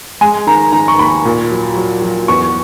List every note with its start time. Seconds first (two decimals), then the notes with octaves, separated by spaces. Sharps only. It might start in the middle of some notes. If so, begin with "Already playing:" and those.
0.21 G#3 G#5
0.47 D#3 A#5
0.73 D#3 A#5
0.88 C#6
0.99 D#2 B5
1.25 A#2
1.51 F#3
1.76 F#3
2.02 F#3
2.28 E2 C#6